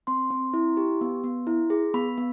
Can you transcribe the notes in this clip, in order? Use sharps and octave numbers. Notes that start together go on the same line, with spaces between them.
C4 C6
C4
E4
G4
B3
B3
E4
G#4
B3 B5
B3